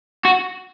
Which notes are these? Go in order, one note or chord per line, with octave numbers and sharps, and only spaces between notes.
F#4